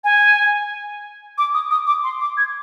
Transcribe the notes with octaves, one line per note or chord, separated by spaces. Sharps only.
G#5
D6
D#6
D#6
D6
C6
D6
G#6